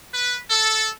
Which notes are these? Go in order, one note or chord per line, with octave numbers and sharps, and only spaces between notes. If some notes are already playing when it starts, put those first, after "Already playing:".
B4
A4